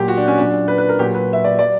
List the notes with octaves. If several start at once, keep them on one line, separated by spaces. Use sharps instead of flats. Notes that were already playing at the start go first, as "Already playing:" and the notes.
Already playing: A#2 F#3 G4
F#4
D4
C#4
A#2 F#3 D4
B4
B4
A#4
A#2 F#3 G4
B4
E5
D5
F#3 D5